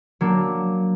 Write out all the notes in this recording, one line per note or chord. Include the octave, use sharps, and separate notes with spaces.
F#3 A#3 D4